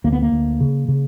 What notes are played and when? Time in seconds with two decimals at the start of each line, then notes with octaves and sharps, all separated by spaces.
0.04 D2 A#3
0.13 B3
0.22 A#3
0.32 D2
0.60 C#3
0.88 C#3